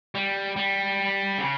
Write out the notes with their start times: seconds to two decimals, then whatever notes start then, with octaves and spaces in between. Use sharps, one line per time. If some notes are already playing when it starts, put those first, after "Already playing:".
0.15 G3
0.56 G3
1.38 C#3